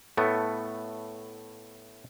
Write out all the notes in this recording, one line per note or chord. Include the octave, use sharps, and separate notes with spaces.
A2 A3 B3